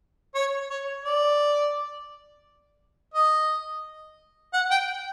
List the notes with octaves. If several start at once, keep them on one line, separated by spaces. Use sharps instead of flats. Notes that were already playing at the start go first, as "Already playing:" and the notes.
C#5
C#5
D5
D#5
F#5
G5